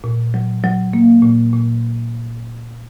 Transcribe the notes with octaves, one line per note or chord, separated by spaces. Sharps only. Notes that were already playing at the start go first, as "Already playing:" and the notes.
A#2
F#3
F#3
A#3
A#2
A#2